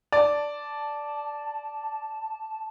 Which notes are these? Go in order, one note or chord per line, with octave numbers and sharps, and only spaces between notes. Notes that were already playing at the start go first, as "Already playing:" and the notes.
D5 A5